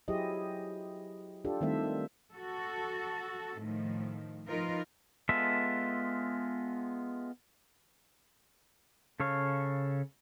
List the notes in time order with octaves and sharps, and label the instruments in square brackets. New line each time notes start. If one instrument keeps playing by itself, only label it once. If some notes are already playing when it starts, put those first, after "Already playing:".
[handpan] F#3 E4 G4 G#4 C5 D#5
D4 F4 G4 A4
D#3 G3 A3 C4 C5 E5
[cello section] F#4 A4
A2 D#3 F3
F3 D#4 F4 A#4 B4
[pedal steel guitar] G#3 B3 F4 A4 E5
C#3 A4 C#5 F5